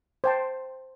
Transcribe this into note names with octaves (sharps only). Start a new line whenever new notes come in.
C5 G5 A5